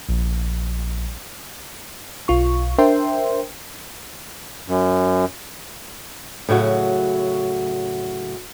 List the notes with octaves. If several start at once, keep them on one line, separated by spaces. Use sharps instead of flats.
A#1
B1 F4 C#6
D4 A#4 C5 E5 G5 C6
F#2
A2 C#3 F#3 F#4